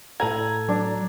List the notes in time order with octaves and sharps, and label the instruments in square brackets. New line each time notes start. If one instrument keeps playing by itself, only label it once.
[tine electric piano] A2 A4 G#6 [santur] A#5
[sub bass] F#3 [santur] D4